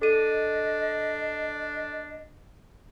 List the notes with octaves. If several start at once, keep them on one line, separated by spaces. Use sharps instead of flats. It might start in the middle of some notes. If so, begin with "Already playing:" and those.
D4 A4 D#5 D#7